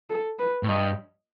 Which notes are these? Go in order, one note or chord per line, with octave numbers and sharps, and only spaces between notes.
A4
B4
A2
G2 D#5